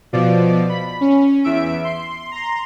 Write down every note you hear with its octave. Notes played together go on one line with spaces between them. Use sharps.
B2 F3 D5
B5
C#4
E2 E5 D7
C6
A#5 C6